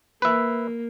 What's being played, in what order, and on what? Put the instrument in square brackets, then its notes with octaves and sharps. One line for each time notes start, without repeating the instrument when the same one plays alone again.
[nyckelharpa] A#3 [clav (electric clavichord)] B4 E5